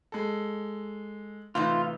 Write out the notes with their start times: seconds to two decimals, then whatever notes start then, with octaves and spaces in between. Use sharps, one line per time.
0.12 G#3 A4
1.55 A2 C3 E3 D#4 F4